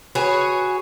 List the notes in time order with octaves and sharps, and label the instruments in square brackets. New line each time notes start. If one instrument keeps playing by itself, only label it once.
[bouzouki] F#4 G#4 B4 C#5